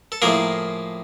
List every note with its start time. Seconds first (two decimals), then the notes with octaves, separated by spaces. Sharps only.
0.12 A4
0.22 A2 F3 A#3 G#4 A#4